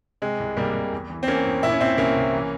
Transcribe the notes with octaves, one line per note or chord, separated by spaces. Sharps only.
C3 G#3
C2
C2 G3 A#3
C2
E2
E3
C4
E3 A#3 C#4
E2
A#2 E4
C#4
A#2 C4 E4
C2 A#3 C#4
C2
E3